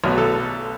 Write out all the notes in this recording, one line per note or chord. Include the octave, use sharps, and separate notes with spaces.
B1 A2 F#3 B3
A4